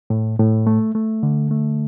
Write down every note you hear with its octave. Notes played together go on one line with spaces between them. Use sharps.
A2
A2
A3
A3
D3
A3